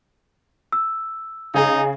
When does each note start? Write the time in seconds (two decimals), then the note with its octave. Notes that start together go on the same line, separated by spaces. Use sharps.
0.72 E6
1.54 C#3 D#4 G#4